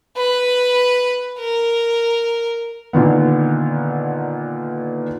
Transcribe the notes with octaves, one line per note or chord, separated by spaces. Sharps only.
B4
A#4
A#2 D3 D#3 B3